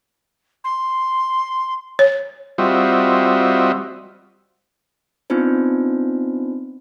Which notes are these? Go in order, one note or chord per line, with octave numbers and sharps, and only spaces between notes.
C6
C#5
G3 C4 F4 F#4 D#5 E5
B3 C4 D4 D#4 F4 C5